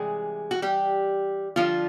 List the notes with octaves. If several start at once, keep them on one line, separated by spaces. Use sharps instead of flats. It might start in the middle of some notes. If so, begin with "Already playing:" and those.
Already playing: C3 E3 G3 G#3 G#4
F#4
G3 G4
D3 F3 G3 F4